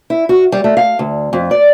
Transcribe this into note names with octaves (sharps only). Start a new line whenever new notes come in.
E4
F#4
G3
A3
F5
D2
F2
D5